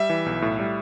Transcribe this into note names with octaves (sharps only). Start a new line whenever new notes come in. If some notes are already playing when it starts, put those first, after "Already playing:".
Already playing: G3 E5
E3
B1
A2
G3